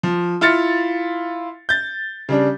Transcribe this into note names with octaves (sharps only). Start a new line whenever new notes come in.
F3
E4 F4 F6 A6 C#7
G6 A6
C#3 G3 D4